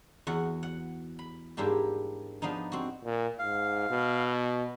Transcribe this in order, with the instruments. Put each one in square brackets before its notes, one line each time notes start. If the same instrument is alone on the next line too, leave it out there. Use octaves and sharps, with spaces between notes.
[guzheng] E2 F#4 F#5
F#5
B5
G#2 A#3 D4 E4 G4
F3 B3 D4 D#4
C4 F#4
[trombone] A#2
[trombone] G#2 [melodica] F5
[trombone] B2